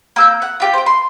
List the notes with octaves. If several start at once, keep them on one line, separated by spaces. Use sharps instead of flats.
A#3 E6 G6
F#5 F#6
F4 G4 G5
C5 G5
C6